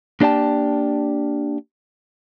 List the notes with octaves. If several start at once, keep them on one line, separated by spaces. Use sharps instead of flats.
A#3 D4 G4 D5 G5 A5